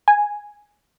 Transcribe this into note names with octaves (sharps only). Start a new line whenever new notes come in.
G#5